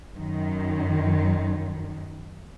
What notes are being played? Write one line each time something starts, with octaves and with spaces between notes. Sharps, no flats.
F#2 D#3